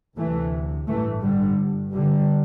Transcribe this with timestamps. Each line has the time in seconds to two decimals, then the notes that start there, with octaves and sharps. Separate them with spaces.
0.17 D2 C3 E3 A3
0.87 A1 G2 E3 A3
1.22 D3 G3
1.57 G1 G2
1.93 D3 G3